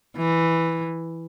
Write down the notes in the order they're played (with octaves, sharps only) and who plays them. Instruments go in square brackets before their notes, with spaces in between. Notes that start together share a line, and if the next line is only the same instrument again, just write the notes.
[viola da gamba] E3